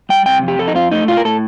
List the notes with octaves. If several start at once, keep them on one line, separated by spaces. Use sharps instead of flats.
G3 G5
C3 G5
F2
G4
F2 A4
D#4
C4 F4
A3 D#4
A2 F4
A#4
A2 A4